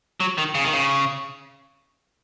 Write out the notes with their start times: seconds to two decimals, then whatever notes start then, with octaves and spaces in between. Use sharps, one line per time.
0.20 F#3
0.38 D#3
0.55 C#3
0.64 D#3
0.73 C#3